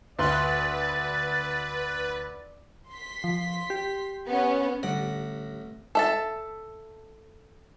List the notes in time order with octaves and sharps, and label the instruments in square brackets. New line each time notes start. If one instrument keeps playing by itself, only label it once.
[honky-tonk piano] D2 C6 F#6 [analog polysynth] B4 [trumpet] D5 [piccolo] A6
[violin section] C6 B6
[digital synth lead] F3
G4
[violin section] B3 C#4
[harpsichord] A1 F#5 [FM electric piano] D3 G3 A#6
[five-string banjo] A4 E5 A5